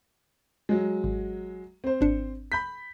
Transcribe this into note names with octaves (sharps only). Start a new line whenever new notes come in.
F#3 G#3
G#1
C4 C5
G#1 D4 C#7
B5 G6 B6